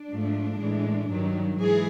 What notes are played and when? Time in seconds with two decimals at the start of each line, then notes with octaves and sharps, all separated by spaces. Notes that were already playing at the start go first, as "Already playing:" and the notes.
Already playing: D4
0.11 G#2 F3 A3
0.60 A2 E3 G#3
1.09 G2 D#3 F#3
1.58 G#2 E3 G#4